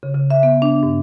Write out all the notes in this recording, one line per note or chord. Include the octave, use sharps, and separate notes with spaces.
C#3
C#3
E5
B3
D4
G2